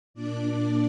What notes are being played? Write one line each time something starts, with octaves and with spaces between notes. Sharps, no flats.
A#2 D4 D5